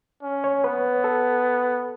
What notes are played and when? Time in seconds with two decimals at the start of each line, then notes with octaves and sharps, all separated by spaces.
0.23 C#4
0.44 C#5
0.64 B3 B4
1.04 A4